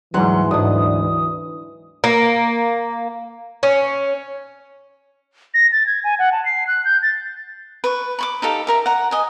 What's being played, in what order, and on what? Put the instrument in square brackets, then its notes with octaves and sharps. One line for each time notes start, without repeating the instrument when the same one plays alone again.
[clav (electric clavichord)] D2 G#2 [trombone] E3 [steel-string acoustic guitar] F#3 F#5 [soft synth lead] C6
[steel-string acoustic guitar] D2 G#2 [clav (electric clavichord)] F#3 D4 [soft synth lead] D#6
[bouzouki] A#3
C#4
[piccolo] A#6
A6
G#6
G#5
F#5
A5
C7
F#6
G6
A6
[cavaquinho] B4 C#6
B5 C#6 D6
D#4 G4 A4 F5
G4 A#4 E5
F#5 A#5
D#5 G#5